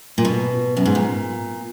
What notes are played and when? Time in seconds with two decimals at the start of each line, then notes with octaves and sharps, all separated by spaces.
0.18 A#2
0.25 B2
0.77 F#2
0.86 G#2
0.95 A#2